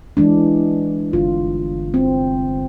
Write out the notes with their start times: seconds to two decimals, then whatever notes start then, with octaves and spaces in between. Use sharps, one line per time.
0.17 E3 G#3 D4
1.13 G1 F4
1.94 C4